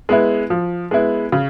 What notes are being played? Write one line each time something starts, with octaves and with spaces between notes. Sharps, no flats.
G#3 B3 E4
F3
G#3 B3 E4
C#3